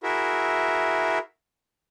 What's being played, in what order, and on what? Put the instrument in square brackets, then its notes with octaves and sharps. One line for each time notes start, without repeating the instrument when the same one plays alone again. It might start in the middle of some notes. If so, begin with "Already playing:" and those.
[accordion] E4 F#4 G#4 A#4 E5